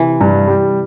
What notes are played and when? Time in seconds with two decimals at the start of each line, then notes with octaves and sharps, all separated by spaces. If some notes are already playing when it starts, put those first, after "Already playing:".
Already playing: C3 E3
0.21 G2
0.48 G3